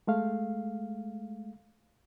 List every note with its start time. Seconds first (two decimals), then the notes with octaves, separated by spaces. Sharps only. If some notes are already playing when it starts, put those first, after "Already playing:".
0.07 G#3 A3 F5